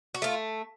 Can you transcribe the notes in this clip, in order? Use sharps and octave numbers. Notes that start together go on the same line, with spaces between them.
F#4
A3 F4